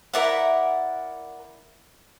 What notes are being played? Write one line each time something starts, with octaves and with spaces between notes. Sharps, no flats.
E4 A#4 D5 E5 F#5